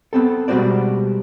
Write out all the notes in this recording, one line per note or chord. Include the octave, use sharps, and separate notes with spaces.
B3 C4 A4
B2 G3 G#3 F#4 C5 D5